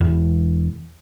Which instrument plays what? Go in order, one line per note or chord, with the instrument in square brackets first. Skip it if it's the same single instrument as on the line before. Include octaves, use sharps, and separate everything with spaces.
[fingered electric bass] E1 E2